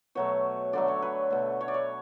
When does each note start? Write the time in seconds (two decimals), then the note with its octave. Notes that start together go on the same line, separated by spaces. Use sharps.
0.15 B2 F#3 A3 C#5
0.73 D3 F#3 A3 D5
0.88 C#5
1.02 B4
1.30 B2 A3
1.61 C#5
1.68 D5
1.74 C#5